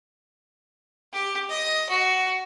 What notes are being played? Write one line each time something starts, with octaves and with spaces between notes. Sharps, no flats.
G4
D#5
F#4